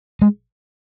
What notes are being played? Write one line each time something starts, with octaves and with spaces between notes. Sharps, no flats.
G#3